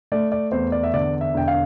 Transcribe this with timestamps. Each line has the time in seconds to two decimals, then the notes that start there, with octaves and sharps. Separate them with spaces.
0.12 A3 D5
0.32 D5
0.52 E2 C5
0.72 D5
0.83 E5
0.93 D3 D5
1.21 E5
1.34 E1 G5
1.48 F5